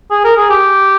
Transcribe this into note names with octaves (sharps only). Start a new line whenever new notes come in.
G#4
A#4
G#4
G4